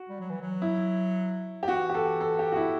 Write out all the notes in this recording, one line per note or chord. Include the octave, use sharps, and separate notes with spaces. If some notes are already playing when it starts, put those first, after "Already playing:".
Already playing: F#4
G3
F#3
E3
F#3
E4
G4
E3 F#4
G4
A4
A4
G4
F#4
E4